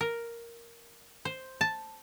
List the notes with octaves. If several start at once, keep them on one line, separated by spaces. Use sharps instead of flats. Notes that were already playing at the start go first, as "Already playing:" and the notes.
A#4
C5
A5